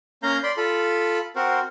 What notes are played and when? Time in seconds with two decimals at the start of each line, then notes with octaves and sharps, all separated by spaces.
0.23 A#3 C#4 F5 A#5 G6
0.43 D5 B5 C6
0.57 F4 A4 B5
1.36 C4 F#4 A#4 C5